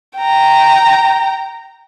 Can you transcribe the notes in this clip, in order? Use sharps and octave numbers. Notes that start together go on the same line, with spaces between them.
G5 A#5